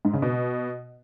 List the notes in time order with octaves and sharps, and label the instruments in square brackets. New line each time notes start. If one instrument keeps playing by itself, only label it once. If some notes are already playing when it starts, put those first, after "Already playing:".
[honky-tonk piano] G#2
C#3
B2